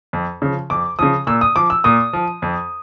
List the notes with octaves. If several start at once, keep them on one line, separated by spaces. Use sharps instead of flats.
F2
C#3 F3
F2 D6
C#3 F3 D#6
A#2 E6
D#6
F3 D6
E6
A#2 D#6
F3
F2